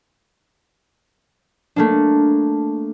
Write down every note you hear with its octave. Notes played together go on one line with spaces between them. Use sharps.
A3 A#3 D4